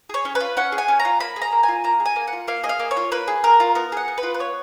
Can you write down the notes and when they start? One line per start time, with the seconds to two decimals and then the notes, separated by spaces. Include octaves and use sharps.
0.09 G#4 C#5
0.25 C#4
0.35 B4
0.40 F4
0.57 C#4 F#5
0.72 G#4
0.78 G#5
0.88 C#4
0.99 A#5
1.05 F4
1.20 A#3 B5
1.36 G#4
1.42 A#5
1.52 A#3
1.63 G#5
1.68 F4
1.84 A#3 A#5
2.00 G#4
2.05 G#5
2.16 A#3
2.27 F#5
2.33 F4
2.48 A#3 F5
2.63 G#4 D#5
2.69 F5
2.79 A#3
2.91 C#5
2.97 F4
3.12 A#3 B4
3.28 G#4
3.44 A#3 A#4
3.60 F4
3.75 B3 A#4
3.92 G#4 F#5
4.08 B3
4.18 B4
4.23 F4
4.34 B4
4.39 B3 C#5